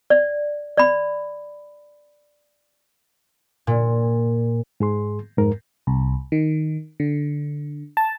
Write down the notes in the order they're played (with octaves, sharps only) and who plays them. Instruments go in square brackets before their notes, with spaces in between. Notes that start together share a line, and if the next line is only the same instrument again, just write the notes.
[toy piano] D5
D5 B5
[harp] A#2
[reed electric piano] G#2 G#4 C6
F2 G#2 A#4
[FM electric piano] C2
D#3
D3
A5